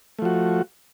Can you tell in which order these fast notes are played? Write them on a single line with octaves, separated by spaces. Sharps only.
A3 F3 F#4